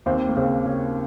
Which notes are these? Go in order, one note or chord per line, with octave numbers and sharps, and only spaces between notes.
D#2 C4
A#3
C#3 C4
C#3 C#4